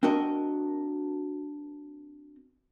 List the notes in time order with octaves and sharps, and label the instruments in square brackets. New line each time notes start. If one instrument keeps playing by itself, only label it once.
[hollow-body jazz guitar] C4 D4 F#4 A#4 D#5